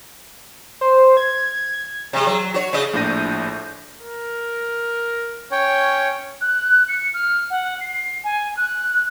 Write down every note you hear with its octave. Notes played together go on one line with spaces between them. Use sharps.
C5
G#6
C3 G#3
F#3
F#4 C#5
C#3 D#5
A#1 A2 D4 G6 A#6 D#7
A#4
C#4 C#5 G5
F#6
C#7
F6
F#5
C7
G#5
F#6